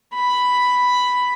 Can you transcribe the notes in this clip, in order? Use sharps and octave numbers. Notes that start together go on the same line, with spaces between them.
B5